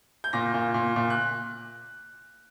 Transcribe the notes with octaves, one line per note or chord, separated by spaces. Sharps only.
G6
A#2 A#6
A#2
A#2
A#2
F#6